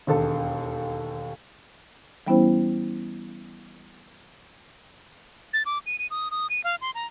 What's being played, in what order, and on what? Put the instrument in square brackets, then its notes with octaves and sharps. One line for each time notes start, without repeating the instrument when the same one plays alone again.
[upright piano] E1 D#2 A4
[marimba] E3 G3 B3 C#4 E4 C5
[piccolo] A6
D6
D#7
D#7
D#6
D#6
D#7
F5
C6
A#5